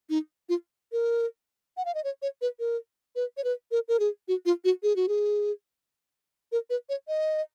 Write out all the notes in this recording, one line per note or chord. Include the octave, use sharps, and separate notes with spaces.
D#4
F4
A#4
F#5
F5
D#5
C#5
C#5
B4
A#4
B4
C#5
B4
A#4
A#4
G#4
F#4
F4
F#4
G#4
F#4
G#4
A#4
B4
C#5
D#5